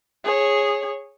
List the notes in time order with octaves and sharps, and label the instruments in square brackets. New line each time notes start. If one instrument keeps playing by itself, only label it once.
[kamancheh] G#4 C#5